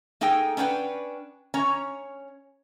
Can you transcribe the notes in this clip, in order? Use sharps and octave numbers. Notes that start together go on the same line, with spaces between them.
A#3 D#4 G#4 A4 G5
C#4 D4 B4 F#5 G5
C#4 C#5 A#5